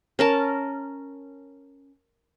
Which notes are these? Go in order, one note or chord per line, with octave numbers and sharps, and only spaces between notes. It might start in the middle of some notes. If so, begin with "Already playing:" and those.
C#4 A#4 A5